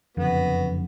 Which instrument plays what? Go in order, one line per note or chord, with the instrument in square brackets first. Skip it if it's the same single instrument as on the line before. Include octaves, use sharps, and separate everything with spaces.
[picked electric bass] F#1 F2 D3 [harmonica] B3 F#4